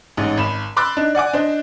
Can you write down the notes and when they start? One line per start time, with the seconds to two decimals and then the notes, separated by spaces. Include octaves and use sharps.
0.17 A1 G#2
0.37 G#1 B5 E7
0.77 B5 C6 D6 E6 F#6 A6
0.97 D4 D#4
1.15 D5 F#5 G#5 D6
1.33 D4 C5 D#5